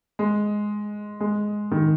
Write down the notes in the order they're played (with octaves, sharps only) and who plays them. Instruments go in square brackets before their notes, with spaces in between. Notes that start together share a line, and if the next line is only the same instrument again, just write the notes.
[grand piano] G#3
G#3
D#3